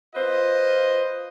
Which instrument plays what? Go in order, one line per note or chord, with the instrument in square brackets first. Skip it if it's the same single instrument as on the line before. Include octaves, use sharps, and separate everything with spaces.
[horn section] F4 B4 C5 D#5